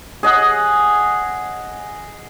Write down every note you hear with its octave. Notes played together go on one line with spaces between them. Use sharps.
G#4 D#5 F#5